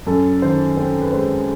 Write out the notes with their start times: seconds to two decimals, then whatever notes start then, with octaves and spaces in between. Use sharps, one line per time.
0.07 F#2 A4
0.42 D#3 C5
0.77 C4 C5
1.02 B4
1.13 G#3 C5